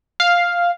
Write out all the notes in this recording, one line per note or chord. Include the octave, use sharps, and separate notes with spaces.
F5